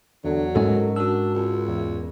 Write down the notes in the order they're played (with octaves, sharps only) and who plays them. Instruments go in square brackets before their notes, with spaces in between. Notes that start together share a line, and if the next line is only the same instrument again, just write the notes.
[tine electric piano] E2 [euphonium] D3 [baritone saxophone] F#3
[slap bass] G#2 G#3 C#4 [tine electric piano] A4 D#5 [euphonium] A#4
[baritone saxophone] D4 [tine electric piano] F#4 E6
[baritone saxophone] C#2
[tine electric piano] E2